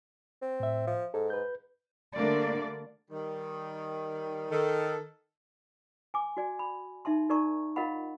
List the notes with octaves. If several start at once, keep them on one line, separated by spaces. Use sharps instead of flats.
C4
A2 E5
F3
G#2 A4
B4 G6
D3 G3 A3 A#3 D4 D5
D#3 G3
D#3 A4
G#5 D6
F#4 D5 G#5
B5
D#4 E5 A5 C6
D#4 A#4 D5 A5 A#5 C#6
F4 A#4 D#5 F5 F#5 B5